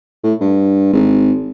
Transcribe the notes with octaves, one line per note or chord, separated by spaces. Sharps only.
A2
G2
G#1